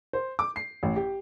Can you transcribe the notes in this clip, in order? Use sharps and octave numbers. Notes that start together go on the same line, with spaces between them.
C5
D6
C7
A1
G4